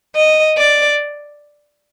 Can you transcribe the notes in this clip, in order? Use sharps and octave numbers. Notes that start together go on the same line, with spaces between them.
D#5
D5